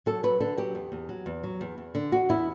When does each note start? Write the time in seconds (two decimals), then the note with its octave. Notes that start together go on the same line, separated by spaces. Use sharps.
0.06 F#3 A4
0.23 F#3 B4
0.40 D3 A4
0.58 F#3 G4
0.75 E2
0.92 E2
1.09 F#3
1.26 E2
1.44 F#3
1.61 E2
1.78 E2
1.95 D3
2.12 E2 F#4
2.29 E2 E4